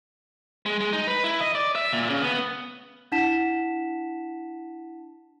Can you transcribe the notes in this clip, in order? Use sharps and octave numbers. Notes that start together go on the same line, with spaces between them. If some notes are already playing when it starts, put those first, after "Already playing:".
G#3
G#3
D#4
B4
E4
D#5
D5
E5
A#2
C#3
B3
D4 E4 F#5 A5 B6 E7